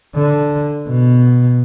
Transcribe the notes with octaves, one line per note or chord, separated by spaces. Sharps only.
D3
B2